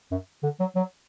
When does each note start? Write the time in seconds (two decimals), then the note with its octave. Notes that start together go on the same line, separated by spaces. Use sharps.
0.11 F#2
0.43 D3
0.60 F#3
0.76 F#3